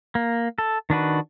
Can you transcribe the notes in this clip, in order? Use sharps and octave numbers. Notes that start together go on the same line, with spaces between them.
A#3
A4
D#3 D4 F#4 B4